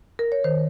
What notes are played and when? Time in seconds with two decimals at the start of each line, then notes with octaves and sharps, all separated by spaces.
0.19 A#4
0.32 C#5
0.44 D#3 C5